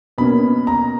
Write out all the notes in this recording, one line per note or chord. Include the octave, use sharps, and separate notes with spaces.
B2 A#3 C#4 B5
A#5